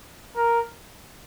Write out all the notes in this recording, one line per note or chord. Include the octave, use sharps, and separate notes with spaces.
A#4